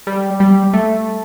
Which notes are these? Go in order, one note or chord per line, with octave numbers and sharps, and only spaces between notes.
G3
G3
A3